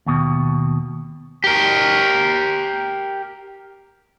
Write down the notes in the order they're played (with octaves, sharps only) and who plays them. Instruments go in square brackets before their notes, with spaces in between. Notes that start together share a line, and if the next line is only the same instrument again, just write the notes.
[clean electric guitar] D#2 B2
[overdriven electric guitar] G4 A#4